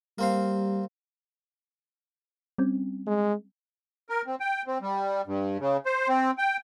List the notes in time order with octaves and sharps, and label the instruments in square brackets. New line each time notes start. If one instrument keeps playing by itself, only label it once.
[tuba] G3 [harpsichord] A#3 C4 F5
[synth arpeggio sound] G3 C4 C#4
[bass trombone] G#3
[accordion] A#4
C4
G5
C4
G3
G2
C#3
C5
C4
G5